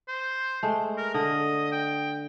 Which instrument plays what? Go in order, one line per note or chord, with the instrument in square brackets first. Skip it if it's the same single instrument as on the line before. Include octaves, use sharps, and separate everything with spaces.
[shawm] C5
[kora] G#3 A3
[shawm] A#4
[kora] D3 [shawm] D#5
[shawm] G5